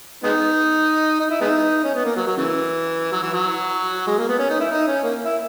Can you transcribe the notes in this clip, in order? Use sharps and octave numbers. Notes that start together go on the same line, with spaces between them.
G#3 B3 D#4
D#4
E4
G#3 B3 D#4
C#4
B3
A#3
F#3
F#3
C#3 E3
F#3
E3
F#3
G#3
A#3
B3
C#4
D#4
E4
D#4
C#4
A#3
E4